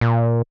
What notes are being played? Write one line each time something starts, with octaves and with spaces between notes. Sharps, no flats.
A#2